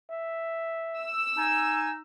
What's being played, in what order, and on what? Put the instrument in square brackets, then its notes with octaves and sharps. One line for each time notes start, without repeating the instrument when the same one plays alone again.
[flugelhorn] E5
[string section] E6
[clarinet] D#4 [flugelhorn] G#5